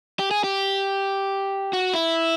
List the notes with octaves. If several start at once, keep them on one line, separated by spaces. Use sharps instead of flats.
G4
G#4
G4
F#4
E4